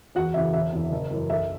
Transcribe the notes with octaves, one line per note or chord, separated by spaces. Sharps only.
E2 F#4 F#5
C#3 E3 E5
E1 E5
E2 E3
F#1
F#2 E3
B1 E5